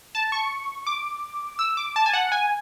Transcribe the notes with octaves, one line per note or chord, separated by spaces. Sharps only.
A5
C#6
D6
E6
D6
A5
G#5
F#5
G#5